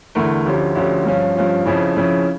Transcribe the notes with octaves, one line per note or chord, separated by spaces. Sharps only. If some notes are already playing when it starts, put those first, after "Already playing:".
E2 D3 A3 E4 A#4
D2 D3 F3 C#4 G4
D2 D3 F3 C#4 G4
G2 F3 C#4 F4
G2 F3 C#4 F4
F2 C#3 F3 C#4 E4
F2 C#3 F3 C#4 E4